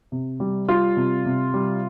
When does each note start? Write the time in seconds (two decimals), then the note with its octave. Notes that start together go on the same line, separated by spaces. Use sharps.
0.12 C3
0.40 G3
0.68 G3 F4
0.97 C3
1.26 C3
1.54 G3